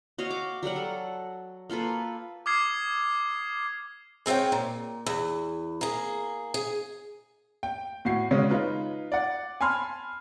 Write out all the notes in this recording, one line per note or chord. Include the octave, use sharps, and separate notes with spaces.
F#4 C#5 D#5 F5
D6
F#3 G3 A#4 F#5
A4
A#3 F4 A4 B4
D6 D#6 F6 G#6 C7
G#3 C4 F4 C#5 G5
A#2
E2
A#3 G#4
G#4
G5
A2 F#4 C7
C#3 G#3 C#4
D#4 F4 B4
D5 F#5
G#5 A5 B5 C6 F6